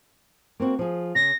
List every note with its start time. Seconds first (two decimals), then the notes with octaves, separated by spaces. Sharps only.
0.60 A#3 C4 F#4
0.79 F3 G#4
1.15 C#3 A#6